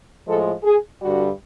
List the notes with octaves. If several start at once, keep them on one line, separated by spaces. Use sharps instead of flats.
A2 F3 G#3 A4
G#4
G2 D3 G3 F#4